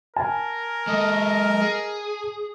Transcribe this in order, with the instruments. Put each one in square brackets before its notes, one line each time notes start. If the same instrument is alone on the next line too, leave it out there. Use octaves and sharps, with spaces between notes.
[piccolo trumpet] A#4 [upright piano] G#5 A5
[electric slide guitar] G#3 A4 [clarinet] D#5
[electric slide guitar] G#4